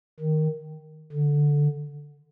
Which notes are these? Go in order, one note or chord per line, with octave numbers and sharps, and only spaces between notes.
D#3
D3